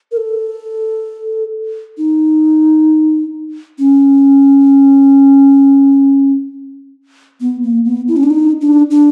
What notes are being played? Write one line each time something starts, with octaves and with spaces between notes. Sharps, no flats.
A#4
A4
D#4
C#4
B3
A#3
B3
E4
C#4
D4
D#4
D4
D4